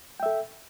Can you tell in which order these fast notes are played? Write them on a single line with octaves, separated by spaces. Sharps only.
G5 E5 A4